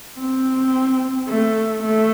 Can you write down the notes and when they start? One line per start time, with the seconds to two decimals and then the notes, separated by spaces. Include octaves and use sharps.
0.20 C4
1.28 A3
1.83 A3